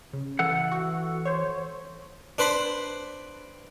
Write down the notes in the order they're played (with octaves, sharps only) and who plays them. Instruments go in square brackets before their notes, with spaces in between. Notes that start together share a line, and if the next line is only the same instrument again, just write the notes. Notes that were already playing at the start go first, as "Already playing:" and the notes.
[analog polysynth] C#3
[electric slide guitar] E3 A4 F#5
[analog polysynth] F#4
C5 C#5
[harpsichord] D4 B4 C5 B5